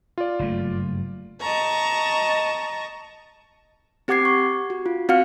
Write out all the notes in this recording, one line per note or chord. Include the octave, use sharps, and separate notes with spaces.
F4 D5
F#1 G2 A3
D#5 A5 A#5 C#6
C4 G4 F#5 D6 G#6 C7
C#6
F#4
F4
C4 F#4 F5 F#5 F6 C#7